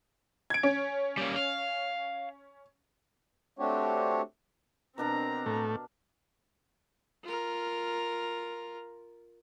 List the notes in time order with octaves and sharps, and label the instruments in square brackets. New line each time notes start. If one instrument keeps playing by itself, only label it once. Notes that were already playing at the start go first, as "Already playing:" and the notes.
[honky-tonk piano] G#6 D7
C#4
[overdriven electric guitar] G3 A#3
F5
[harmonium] A3 C4 D4 F#4 G4 C#5
[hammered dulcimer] B2 D4 A#4 [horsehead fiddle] C4 A#5
[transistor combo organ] A2 A3
[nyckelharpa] F4 A#4